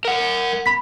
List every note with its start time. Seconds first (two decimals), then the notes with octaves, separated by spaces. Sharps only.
0.05 A#4 F#5
0.66 B5 B6